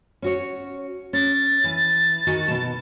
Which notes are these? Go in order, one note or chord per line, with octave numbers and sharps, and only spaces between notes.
C#4 F#4 C#5
C#4 A6
E3
D#3 F#4 G#5
B2 A5